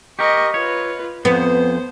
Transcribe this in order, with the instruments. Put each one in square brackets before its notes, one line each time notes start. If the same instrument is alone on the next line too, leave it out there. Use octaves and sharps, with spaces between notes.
[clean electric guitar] G4 A#4 [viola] D#5 C#6
[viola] F4 B4 [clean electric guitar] C#5
[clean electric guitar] F2 [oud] B3 [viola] C5